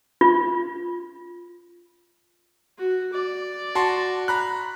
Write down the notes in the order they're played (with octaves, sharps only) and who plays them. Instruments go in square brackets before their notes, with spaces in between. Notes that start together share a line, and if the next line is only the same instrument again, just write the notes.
[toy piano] F4
[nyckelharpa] F#4
D5
[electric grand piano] F#4 A5 C6
A#5 B5 F#6